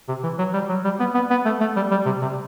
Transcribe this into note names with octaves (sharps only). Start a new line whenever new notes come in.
C3
E3
F#3
G3
F#3
G3
B3
B3
B3
A3
A3
G3
G3
C3
C3